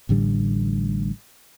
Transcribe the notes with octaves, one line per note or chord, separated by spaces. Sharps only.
A1 A2 D3 G3